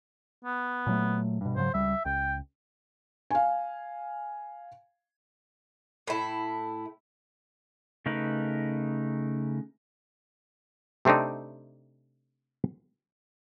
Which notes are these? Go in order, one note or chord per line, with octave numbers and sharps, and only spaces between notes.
B3
A#2 F#3 A3
G2 B2
G#2 C#3 F#3 C5
C#2 G3 E5
C#2 G5
F5 G#5
A2 E4
C#3 A3 D#4 A#4 B4
C3 A3 C4 D4 D#4